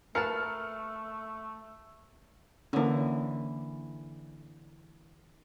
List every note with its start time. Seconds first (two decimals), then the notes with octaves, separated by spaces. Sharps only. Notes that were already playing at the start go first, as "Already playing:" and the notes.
0.15 A3 A#4 B4 A5 F6 C#7
2.73 D3 E3 A#3 C#4